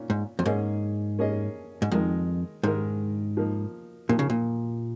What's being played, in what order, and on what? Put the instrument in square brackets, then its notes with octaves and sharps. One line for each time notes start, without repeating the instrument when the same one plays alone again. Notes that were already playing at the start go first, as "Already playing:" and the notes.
Already playing: [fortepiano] A#2 C#4
[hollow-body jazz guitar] G#2
F2
[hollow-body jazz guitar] G#2 [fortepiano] A#3 C#4 G#4 D#5
[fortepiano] A#3 C#4 G#4 D#5
[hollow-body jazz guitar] G#2
[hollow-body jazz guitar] F2 [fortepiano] D#3 G#3 D#4 A#4
[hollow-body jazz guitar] G#2 [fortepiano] D#3 G#3 D#4 A#4
[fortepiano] F3 A#3 D#4
[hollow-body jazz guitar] A#2 [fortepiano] F3 A#3 D#4
[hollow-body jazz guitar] C#3
A#2